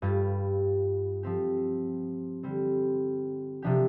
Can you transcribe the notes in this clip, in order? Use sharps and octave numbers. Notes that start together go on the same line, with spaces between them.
G2 G3 F4
F3 C4 G4
D3 G3 C4
C3 F3 D4 G4